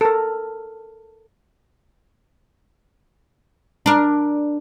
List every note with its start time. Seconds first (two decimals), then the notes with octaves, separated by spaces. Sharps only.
0.01 A4 A#4
3.86 D4 A#4